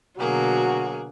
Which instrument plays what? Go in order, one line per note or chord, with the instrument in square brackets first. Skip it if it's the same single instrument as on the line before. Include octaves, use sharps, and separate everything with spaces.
[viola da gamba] B2 D3 [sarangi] F#3 [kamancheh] A#3 G#4 [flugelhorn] F#4